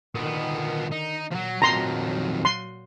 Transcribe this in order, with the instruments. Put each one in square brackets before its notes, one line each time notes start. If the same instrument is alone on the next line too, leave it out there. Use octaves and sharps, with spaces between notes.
[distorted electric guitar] A#2 B3 [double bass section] D3 D#3
[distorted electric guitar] D#4
[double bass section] A#2 [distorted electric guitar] F3 F#3
[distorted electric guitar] F2 D#3 [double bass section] A#2 F#3 [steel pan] A#5 C6
[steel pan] C6